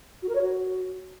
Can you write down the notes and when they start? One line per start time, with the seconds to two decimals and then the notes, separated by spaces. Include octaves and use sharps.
0.22 F#4
0.29 A#4
0.35 C#5
0.42 F#4